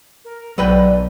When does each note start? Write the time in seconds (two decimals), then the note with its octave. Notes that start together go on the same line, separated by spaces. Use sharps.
0.25 A#4
0.58 B1 F#3 B4 D5 G5